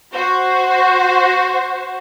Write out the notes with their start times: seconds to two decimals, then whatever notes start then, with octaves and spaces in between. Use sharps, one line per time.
0.13 F#4 C5